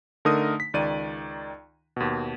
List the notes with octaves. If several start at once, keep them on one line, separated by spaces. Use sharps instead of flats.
D3 A3 D#4 A#4 D#6
B6
C#2 D#3 D5 D#7
D#2 B2